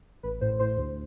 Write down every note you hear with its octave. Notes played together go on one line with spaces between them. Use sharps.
A1 B4
A2 C5
A2 C5
D2